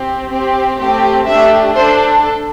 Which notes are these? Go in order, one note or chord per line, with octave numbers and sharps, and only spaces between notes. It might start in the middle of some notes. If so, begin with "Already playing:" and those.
Already playing: C4 G4
C4 G4
A3 C4 G4
A3 D4 G4 E5
D4 A4 C5
A4